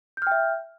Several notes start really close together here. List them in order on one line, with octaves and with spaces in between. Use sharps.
G6 F6 G5 E5